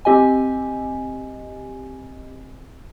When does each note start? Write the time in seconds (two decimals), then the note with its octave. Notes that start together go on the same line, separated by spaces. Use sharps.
0.05 C4 G4 D#5 G#5